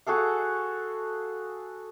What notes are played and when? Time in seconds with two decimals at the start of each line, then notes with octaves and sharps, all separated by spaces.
0.07 F#4 G#4 A4 F5